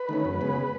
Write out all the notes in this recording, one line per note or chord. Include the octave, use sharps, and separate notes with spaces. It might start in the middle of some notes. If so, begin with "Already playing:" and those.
Already playing: B4
D#3 A3 C#4
F#2
C#3 G#3 B3